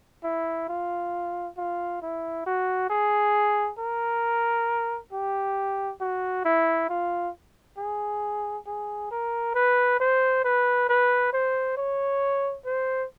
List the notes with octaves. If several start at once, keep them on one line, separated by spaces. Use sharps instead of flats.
E4
F4
F4
E4
F#4
G#4
A#4
G4
F#4
E4
F4
G#4
G#4
A#4
B4
C5
B4
B4
C5
C#5
C5